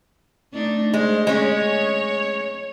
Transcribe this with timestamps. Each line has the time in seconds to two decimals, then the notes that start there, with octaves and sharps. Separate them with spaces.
0.53 A3 D4 D#4
0.94 G#3 C5
1.27 G#3 C#4 C#5